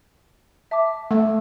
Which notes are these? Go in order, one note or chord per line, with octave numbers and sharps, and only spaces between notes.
E5 A5 D6
A3